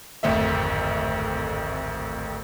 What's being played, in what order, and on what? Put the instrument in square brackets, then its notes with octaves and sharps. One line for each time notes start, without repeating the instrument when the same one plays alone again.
[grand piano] D1 G#1 F2 A3 E5